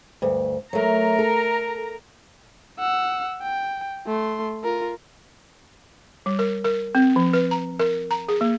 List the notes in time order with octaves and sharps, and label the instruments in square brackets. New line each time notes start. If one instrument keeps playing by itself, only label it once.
[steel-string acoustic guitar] D2 G2
[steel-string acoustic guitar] F#3 A3 [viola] A#4 A#5
[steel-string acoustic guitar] A4
[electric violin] F#5 E6
G5
A3 C6
F4 A#4
[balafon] G3
A#4
A#4
C4
F3
B4
A#5
A#4
A#5
G#4
A#3